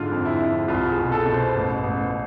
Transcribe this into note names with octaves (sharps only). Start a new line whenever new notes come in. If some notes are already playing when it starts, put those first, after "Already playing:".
Already playing: G#2 D3 F4
F2
E4
F2
C2 F4
G#4
B2
A4
B2
C5
A1
A1